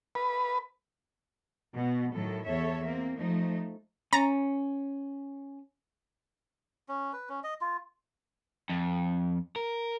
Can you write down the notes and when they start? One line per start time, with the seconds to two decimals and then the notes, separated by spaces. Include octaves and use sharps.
0.15 B4
1.75 B2 B3
2.14 A2 D#3 F#3 A4
2.45 E2 A4 C#5 E5
2.85 A#3 C4
3.18 F3 A3 D#4
4.13 C#4 A#5 A6
6.89 C#4
7.13 B4
7.29 C#4
7.44 D#5
7.61 F4
8.69 F2
9.56 A#4